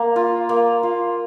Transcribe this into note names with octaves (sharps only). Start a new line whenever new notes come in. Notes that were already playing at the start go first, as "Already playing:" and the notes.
Already playing: A#3
F4
A#3
F4